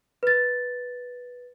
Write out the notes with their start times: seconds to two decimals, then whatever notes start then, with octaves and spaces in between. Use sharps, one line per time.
0.23 B4 A6